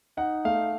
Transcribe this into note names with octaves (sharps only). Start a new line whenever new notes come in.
D#4 F#5
A3 F5